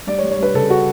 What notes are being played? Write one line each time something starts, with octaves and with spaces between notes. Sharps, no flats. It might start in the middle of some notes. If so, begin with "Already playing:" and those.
G3 D5
C#5
G3
C#5
G3 B4
C#3 A4
F#4